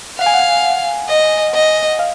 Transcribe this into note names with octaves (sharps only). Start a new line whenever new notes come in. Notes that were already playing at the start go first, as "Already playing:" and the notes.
F5 F#5
G#5
F#5
D#5
D#5
F5